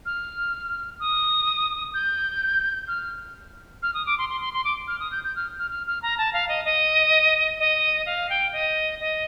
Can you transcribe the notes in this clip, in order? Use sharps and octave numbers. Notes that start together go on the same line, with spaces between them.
F6
D#6
G6
F6
F6
D#6
D6
C6
C6
C6
C6
D6
F6
D#6
G6
G6
F6
F6
F6
F6
A#5
A5
F5
D#5
D#5
D#5
F5
G5
D#5
D#5